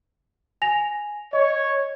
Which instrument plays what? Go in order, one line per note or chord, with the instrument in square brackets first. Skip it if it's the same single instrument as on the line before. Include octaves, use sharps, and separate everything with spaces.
[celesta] G#5 A#6 F7
[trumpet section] C#5 [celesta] D#5